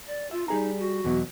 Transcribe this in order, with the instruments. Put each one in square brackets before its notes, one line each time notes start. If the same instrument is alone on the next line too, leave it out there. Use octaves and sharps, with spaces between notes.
[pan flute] D5
[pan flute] F4 [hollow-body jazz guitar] E5
[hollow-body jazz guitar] G3 G#4 A#5 [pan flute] D#4
[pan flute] F#4
[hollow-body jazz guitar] E2 B2 F#3